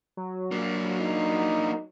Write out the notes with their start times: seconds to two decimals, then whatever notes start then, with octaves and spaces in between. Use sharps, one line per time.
0.17 F#3
0.52 A#3 D4
1.01 D#4